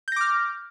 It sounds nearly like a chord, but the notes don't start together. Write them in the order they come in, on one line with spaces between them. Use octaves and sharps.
G6 A#6 D6 F6